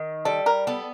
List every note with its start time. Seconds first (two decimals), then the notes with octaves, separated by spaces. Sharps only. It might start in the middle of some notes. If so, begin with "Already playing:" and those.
Already playing: D#3
0.25 G3 A4
0.46 A#4
0.67 B3 A4